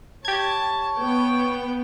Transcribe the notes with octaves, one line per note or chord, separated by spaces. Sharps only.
G4 C#5 A5 G#6
B3 G5